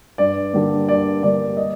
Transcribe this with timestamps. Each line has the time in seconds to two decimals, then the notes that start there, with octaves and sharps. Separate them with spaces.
0.18 G2 D5
0.53 D3 G3 A#3
0.88 G2 D5
1.23 D3 G3 A#3 D5
1.57 D#5